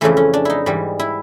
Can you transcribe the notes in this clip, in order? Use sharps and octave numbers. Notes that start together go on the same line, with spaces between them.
F2 C#3 E3 A3
C#4
D4
D#4 E4
G#2 E3 G3
E4